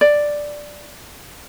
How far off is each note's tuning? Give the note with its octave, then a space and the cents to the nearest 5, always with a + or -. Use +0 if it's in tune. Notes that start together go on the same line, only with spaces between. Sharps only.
D5 +5